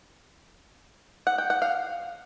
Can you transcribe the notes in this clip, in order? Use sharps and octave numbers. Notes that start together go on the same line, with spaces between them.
F#5
G5
F#5
F5